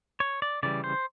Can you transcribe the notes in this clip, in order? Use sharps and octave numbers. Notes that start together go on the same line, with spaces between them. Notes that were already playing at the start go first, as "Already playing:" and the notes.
C#5
D5
C#3 E3 G3 D5
C5